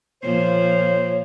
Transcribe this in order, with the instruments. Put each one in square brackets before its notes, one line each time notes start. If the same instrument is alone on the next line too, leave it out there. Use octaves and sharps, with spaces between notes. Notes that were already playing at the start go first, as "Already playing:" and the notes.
[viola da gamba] A#2 F3 [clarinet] C5 [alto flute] C#5